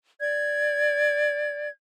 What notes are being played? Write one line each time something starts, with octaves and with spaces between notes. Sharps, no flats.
D5 G#6